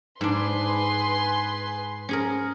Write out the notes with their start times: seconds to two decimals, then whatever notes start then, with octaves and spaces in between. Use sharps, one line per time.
0.21 G#2 D4 G#4 B4 C6
2.09 C#4 G#4 A#4